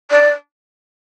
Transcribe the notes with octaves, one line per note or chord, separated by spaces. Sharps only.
D5